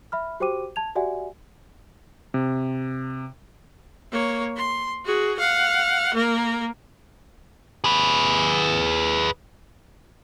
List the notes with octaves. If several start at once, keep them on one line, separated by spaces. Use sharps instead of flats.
E5 B5 F6
F#4 G4 C5 G5 D6 D#7
A5 G#6 F7
F#4 G4 D5 E5 F#5 G#5
C3
A#3 C#5
C6
F#4 G#4
F5 F#5
A#3 A#4
G#4 B4